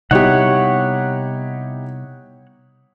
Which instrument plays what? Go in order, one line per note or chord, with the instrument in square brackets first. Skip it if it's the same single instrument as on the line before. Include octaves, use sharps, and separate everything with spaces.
[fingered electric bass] C3 G3 B3 [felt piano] D#4 E4 G4 [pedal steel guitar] C#5 F#5